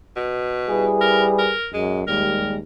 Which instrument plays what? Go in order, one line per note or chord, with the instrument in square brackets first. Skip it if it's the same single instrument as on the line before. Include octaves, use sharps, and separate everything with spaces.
[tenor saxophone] B2
[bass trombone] G3 [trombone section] E4 G#4 B4
[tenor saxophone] A#4
A#4
[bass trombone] F#2 [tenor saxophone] G#3
[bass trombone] D#2 [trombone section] G3 G#3 [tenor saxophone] A#4